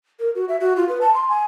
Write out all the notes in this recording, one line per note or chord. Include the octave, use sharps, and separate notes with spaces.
A#4
F#4
E5
F#4
F4
B4
A5
C6
G#5